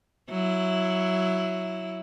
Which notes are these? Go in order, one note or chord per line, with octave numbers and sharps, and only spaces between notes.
F#3 E4